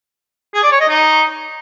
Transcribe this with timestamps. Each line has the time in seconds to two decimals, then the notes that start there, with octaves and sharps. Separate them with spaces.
0.54 G#4
0.63 D5
0.72 C#5
0.80 D#5
0.89 D#4